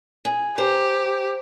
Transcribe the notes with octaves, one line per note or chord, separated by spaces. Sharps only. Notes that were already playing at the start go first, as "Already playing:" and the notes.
G#4
G4 C5 A#5